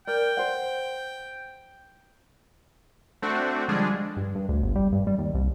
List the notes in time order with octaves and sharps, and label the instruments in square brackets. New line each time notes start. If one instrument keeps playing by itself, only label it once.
[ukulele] A#4 D5 [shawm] G5
[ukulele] C5 F#5
[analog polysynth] A3 C4 D4 F#4
D3 F3 G3 G#3 D4 G#4
[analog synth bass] G2
G2
D2
G1
G3
G2
G3
D#2
C2